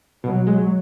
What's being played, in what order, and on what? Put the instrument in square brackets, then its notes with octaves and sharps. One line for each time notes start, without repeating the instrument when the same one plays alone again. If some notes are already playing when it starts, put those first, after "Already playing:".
[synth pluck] B2 [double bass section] F#3
[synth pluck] G#3